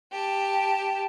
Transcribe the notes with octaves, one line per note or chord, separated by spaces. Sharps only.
G4 A5